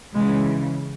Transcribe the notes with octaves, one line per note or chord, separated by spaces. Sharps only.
C#3 E3 G#3